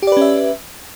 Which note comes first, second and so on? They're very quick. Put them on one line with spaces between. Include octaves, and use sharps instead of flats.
G4 D5 B4 C#4 E5